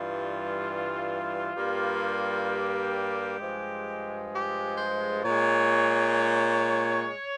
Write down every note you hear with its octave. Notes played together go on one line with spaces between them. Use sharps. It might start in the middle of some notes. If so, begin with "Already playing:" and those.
Already playing: G2 E3 G3 F4
G2 G3 A#3
G4
G2 F3 G#3
G4
C5
A#2 G#3 C#5